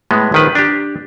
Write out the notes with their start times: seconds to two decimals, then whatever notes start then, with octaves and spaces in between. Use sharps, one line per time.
0.11 A2 G#3 B3
0.32 A#1 D#3 B4
0.55 D4 G4